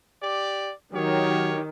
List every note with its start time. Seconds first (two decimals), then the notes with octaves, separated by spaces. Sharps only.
0.21 G4 D5
0.94 D#3 F#3 G4 C#5